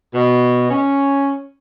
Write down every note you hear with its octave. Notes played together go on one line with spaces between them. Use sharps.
B2
C#4